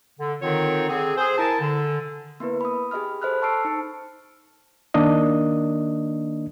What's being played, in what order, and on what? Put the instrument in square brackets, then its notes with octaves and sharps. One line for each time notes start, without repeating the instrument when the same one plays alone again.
[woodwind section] D3
D3 D#3 C4 D#4 F4 C#5
D3 C4 G#4
G#4 C5
E4 A#4 G#5 A5
D3
[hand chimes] A#3 B3 E4 B4
B5 D#6
G4 G#4 D#5 B5 F6
A4 C5 D#5 B5 F6 F#6
A5 C#6 E6 F6 C7 D7
D#4 C#7
[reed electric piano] D#3 A#3 D4 D#5